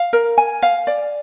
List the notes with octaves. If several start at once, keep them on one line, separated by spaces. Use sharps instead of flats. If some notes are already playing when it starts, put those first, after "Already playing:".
Already playing: F5
A#4
G#5
F5
D5